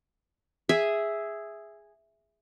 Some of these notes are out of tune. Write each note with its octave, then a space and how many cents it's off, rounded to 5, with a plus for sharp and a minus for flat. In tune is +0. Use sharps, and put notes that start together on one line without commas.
G#4 -5 E5 +0